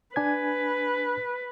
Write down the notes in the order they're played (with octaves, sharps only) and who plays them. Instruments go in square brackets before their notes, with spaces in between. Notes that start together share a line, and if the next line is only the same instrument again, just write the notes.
[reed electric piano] D4 G#5 G#6 [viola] B4